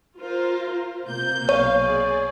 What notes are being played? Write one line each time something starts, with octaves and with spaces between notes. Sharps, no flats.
F4 A#4 C5
C3 A#3 G6
B1 C#5 F5
G#4 D5